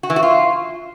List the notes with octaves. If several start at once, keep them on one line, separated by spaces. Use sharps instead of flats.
F#4
E3
F#4
F4